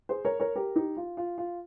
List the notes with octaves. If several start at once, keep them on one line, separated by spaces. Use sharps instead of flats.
G#4 C5
A#4 C#5
A#4 C#5
G4 A#4
D#4 G4
F4
F4
F4